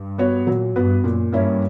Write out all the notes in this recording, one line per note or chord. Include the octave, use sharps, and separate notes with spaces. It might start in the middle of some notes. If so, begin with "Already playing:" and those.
Already playing: G2
B3 F#4 C#5
A#2 F#3
G2 B3 F#4 B4
F#2 A#2
G2 A#3 C#4 E4